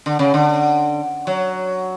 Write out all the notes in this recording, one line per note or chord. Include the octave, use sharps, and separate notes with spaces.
D3
C#3
D3
F#3